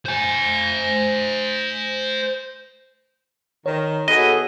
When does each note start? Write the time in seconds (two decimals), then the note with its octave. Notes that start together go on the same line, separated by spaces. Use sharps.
0.06 C5 G#5
3.66 D#3 C#5
4.08 B3 F#4 G#4 A4 D#5